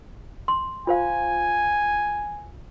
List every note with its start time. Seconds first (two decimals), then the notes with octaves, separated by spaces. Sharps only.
0.48 C6
0.87 F4 C5 F5 G#5